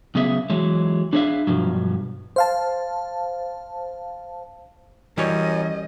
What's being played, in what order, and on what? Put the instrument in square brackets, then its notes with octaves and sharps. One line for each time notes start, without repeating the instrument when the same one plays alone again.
[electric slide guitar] C#3 F#3 B3 G#4 E5
E3 F#3 G#3
D4 G#4 B4 C#5 E5 F5
G2 B2 F3 F#3
[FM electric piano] C5 F5 A5
[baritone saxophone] F#2 [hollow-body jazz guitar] E3 [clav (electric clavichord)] G3 C#4 C#5 [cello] D#5